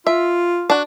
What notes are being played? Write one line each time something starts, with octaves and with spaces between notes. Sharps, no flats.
F4 E5
D4 F#4